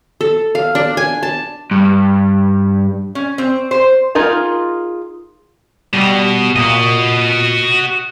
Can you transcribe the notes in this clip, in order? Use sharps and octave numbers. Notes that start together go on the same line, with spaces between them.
A4
F5
D4
G#5
A5
G2
C#4
C4
C5
D#4 F4 G#4 A#4
B2 G3
A#2 F#4 D#5